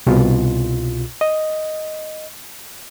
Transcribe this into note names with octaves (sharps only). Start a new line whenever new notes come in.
C2 B2 F4
D#5